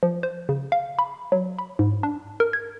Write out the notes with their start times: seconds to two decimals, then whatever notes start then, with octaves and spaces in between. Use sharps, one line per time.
0.03 F3
0.23 C5
0.49 C#3
0.72 F5
0.99 B5
1.32 F#3
1.59 B5
1.79 G#2
2.03 D4
2.40 A#4
2.53 G#6